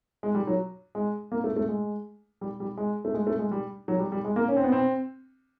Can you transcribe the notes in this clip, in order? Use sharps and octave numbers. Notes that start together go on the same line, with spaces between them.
G#3
G3
F#3
G#3
A#3
A3
A3
G#3
G3
G3
G#3
A3
G#3
A3
G#3
G3
F#3
G3
G3
G#3
A#3
C#4
C4
B3
C4